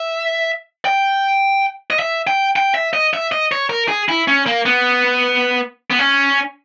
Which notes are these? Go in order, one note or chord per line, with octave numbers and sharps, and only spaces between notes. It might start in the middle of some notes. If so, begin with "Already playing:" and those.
Already playing: E5
G5
D#5
E5
G5
G5
E5
D#5
E5
D#5
C#5
A#4
G#4
E4
C#4
A#3
B3
B3
C#4